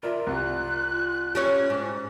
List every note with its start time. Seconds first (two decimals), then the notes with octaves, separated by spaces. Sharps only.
0.03 F4 A#4 D5 E5
0.27 C2 F#6
1.35 G3 C#4 C#5
1.70 G#2